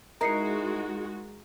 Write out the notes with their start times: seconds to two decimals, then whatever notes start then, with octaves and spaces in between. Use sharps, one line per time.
0.21 G#3 D#4 E4 F#4 A#4 A#5 C7 C#7